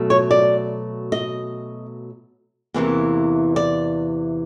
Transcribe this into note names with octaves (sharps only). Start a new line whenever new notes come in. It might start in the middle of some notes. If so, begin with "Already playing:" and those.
Already playing: B2 F#3 A3
C#5
D5
D#5
E2 C3 E3 G3 A#3
D5